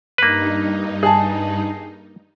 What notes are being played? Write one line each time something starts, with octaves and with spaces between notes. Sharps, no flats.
G2 A#3 D#4 B4
G#4 A5